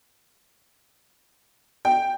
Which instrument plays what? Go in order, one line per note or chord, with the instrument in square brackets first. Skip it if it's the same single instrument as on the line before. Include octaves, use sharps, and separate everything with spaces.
[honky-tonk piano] G5